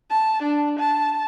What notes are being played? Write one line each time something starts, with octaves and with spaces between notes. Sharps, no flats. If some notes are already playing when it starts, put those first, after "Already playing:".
A5
D4
A5